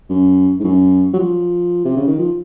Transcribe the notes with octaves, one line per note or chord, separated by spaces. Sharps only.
F#2
G#2
F#2
F#3
F3
C3
C#3
D#3
F3